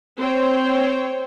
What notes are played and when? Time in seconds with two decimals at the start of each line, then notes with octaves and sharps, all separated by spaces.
0.19 C4 C5 C#5 G5